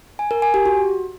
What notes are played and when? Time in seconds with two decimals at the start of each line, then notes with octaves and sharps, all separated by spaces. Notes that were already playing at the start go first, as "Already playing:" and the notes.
0.19 G#5
0.31 A#4
0.42 G#5
0.54 G4
0.66 F#4